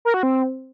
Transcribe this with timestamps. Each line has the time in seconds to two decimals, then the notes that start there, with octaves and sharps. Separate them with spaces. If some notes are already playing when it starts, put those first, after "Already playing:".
0.05 A#4
0.14 F#4
0.23 C4